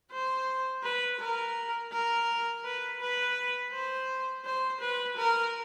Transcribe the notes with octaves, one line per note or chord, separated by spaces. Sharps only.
C5
B4
A#4
A#4
B4
B4
C5
C5
B4
A#4